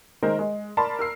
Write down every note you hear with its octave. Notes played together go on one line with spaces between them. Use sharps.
D#3 G#3 A#4 C5
G#3
A#4 D5 A5 B5 C6
A#4 E6 C7